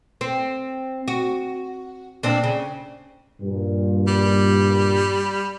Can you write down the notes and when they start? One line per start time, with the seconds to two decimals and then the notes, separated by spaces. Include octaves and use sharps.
0.21 C4
1.08 F#4
2.23 A#2 C4 D4
2.44 C#3
3.41 G2 A#2
4.07 G3